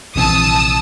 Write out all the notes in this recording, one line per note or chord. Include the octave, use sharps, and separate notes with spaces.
A#1 C3 E3 A5 D#6 E6